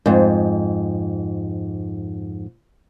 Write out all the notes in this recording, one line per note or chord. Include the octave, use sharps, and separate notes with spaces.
F2 G#2